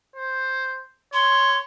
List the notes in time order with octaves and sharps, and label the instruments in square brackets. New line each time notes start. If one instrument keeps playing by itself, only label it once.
[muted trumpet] C5
[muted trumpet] C#5 [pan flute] C6